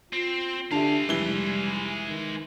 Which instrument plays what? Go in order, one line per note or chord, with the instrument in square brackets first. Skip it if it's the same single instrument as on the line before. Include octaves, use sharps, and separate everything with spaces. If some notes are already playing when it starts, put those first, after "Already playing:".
[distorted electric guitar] C4 [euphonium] F4
[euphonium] D3 [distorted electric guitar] G#3 F5 [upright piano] D4 G4 E5 [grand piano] A5
[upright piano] F1 [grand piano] E3 G7 [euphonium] G3
[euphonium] D#3